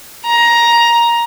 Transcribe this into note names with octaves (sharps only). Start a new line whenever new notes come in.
A#5